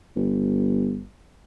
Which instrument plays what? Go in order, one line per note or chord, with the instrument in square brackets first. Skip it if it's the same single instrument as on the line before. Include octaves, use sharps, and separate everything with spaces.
[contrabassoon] G1